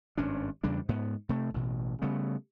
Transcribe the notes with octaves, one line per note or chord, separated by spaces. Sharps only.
G#1 G2 C#4 D4
E2 C#3 G3 D4
G#2 B3
C3 A3
A1 B2
C#3 G3 A3 B3